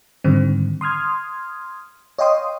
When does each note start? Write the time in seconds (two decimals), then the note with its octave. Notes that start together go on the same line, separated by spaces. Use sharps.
0.24 G#2 D3 D#3 G3 C4
0.81 C6 D#6 F6 G#6
2.18 C#5 D#5 F5 G5 C6 D#6